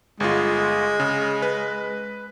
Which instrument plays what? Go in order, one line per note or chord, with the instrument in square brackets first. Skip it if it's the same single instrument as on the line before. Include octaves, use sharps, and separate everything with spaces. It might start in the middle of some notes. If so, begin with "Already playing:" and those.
[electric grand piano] G1 F4 [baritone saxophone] G#3
[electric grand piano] C#3
B4